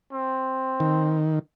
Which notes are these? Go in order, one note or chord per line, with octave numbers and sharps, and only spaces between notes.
C4
D#3